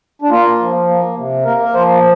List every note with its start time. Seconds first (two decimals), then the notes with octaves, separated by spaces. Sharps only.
0.22 D4
0.30 A#3 F4
0.59 F3
0.88 A#3
1.17 C3
1.45 A#3 A#4
1.63 A#4
1.74 F3 C5